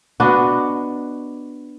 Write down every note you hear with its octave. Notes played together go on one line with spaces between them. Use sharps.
B3 D4 F#4 D#5